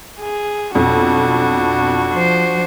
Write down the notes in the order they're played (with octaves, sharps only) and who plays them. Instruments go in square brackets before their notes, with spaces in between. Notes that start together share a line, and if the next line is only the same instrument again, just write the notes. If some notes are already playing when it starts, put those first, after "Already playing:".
[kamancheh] G#4
[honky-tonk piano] B1 F2 [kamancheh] D4 F#4
[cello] F3 C5